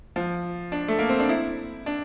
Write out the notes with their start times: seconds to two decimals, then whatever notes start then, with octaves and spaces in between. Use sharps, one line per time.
0.16 F3
0.72 D4
0.88 A3
0.99 A#3
1.09 C4
1.19 D4
1.29 E4
1.86 D4